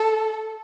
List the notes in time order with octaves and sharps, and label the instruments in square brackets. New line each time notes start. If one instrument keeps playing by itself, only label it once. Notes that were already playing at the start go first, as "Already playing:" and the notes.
Already playing: [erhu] A4